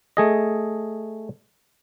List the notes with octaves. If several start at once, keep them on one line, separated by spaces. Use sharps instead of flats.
A3 G#4 D#5